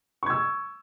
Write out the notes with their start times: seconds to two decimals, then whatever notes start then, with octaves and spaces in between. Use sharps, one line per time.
0.23 C#6
0.26 G#6
0.30 E6